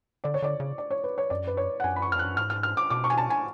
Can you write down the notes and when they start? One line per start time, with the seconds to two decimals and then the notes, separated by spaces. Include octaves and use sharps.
0.24 D3 D5
0.34 C#5
0.42 D3 D5
0.60 C#3
0.78 D5
0.91 C#5
1.04 B4
1.18 C#5
1.30 F#2 D5
1.47 B4
1.57 C#5
1.80 F#5
1.84 F#2 G#5
1.96 B5
2.02 C#6
2.12 F2 F6
2.19 F#6
2.25 F#2
2.37 G#2 F6
2.50 F6
2.63 F6
2.77 D6
2.90 B2 D6
3.04 C#6
3.10 G#5
3.18 A5
3.30 G#5